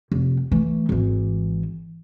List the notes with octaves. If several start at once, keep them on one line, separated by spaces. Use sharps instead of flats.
F1
E3 A3
G#1 E3